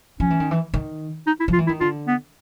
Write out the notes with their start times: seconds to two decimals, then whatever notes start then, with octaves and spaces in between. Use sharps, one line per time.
0.20 F3 C#4
0.30 E3
0.40 D#3
0.51 E3
0.74 D#3
1.27 D#4
1.40 E4
1.48 F3
1.53 F4
1.58 E3
1.67 D#3 E4
1.80 D3 F4
2.07 B3